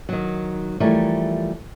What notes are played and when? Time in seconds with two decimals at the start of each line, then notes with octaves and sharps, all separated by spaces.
0.09 D#3 F#3
0.80 E3 F3 G3 A3 A#4 C#5